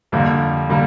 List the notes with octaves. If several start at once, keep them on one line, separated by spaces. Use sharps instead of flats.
F2 D3 G3 A#3
D3 G3 A#3